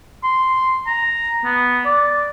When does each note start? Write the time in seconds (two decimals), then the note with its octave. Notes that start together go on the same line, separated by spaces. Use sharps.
0.24 C6
0.87 A#5
1.45 B3
1.85 D5